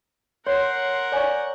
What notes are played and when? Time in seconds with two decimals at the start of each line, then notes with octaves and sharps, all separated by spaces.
0.47 A#4 C#5 F#5 C6 C7
1.12 C#5 D5 G#5 C#6